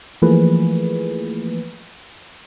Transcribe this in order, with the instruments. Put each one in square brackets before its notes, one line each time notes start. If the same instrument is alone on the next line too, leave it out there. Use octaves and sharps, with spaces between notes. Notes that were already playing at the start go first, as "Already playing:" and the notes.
[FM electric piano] E3 F3 A3 A#3 G#4 B4